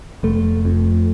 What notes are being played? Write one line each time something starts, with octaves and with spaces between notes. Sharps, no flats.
F1 A3
F2